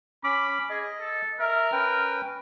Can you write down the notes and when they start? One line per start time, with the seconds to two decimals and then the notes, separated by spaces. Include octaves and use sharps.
0.24 C#4 B5 D6
0.70 G#4 D#5
1.00 A4
1.40 A#4 E5
1.72 C#4 B4 G5